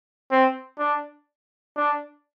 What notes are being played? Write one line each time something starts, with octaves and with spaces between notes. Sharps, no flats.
C4
D4
D4